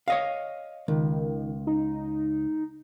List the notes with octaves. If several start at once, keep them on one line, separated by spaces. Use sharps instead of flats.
C#5 D#5 F5
C#2 D#3
D#4